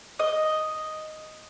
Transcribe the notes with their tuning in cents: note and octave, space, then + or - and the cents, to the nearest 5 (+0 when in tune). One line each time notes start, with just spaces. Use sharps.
D#5 +0